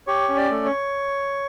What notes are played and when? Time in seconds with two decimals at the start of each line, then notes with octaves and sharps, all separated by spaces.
0.07 G4 C#5
0.29 C#4
0.37 D5
0.51 A3
0.65 C#5